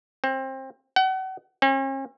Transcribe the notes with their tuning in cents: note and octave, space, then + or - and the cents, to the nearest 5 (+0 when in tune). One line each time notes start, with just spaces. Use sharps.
C4 +25
F#5 +35
C#4 -45